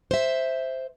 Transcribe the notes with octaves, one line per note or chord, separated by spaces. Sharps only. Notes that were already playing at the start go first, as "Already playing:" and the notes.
C5 E5